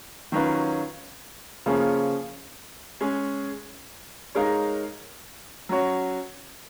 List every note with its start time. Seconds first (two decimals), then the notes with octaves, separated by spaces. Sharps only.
0.32 D#3 F#3 C#4 F4 B4
1.66 C#3 F3 A#3 C#4 G#4
3.01 G#3 C#4 G#4
4.35 G#3 D#4 A#4 C#5 F5
5.69 F#3 C#4 F#4 C#5